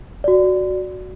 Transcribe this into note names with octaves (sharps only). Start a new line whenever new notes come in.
F#4 D5